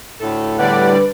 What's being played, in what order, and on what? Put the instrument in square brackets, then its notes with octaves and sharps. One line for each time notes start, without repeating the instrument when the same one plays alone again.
[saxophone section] D2 A4 [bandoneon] A2
[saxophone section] E2 B3 F#5 [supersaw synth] D3 G3 D5 [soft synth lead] B4